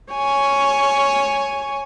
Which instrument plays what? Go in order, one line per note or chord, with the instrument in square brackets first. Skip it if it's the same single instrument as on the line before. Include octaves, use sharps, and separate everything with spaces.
[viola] C#5 G#5